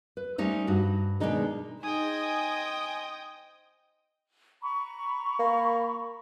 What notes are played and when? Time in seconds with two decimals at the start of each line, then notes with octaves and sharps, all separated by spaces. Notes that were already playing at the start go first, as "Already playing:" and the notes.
0.17 B4
0.38 G3 A3 C#4 D#4 C5
0.67 G2 F#4
1.20 B2 D#3 G#3 D4 D#4 G#4
1.83 D#4 G#4 C5 D#5 G5 G#5 D#6
4.62 A#5 B5 C#6
5.39 A#3